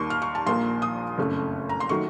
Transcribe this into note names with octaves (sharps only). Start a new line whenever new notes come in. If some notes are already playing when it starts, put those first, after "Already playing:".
Already playing: D#2 D#3 A#3 C6 C#6
F6
C#6
A5
A#1 A#2 F3 A#3 C6
D#6
F#1 F2 C#3 A3
A#5
C6
D#3 F#3 A3 C#6